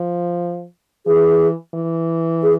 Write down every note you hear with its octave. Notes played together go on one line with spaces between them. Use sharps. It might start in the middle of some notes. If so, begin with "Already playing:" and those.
Already playing: F3
E3 G#4
E3
G#4